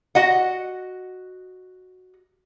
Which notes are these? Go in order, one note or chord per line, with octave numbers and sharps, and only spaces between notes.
F#4 D#5 F#5